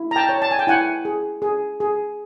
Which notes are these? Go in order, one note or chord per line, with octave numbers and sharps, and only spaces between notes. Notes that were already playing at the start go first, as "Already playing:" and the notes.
Already playing: E4
A#5
G5 A5
C#5
A5
G#5
G5
E4 F#5 G#5
G#4
G#4
G#4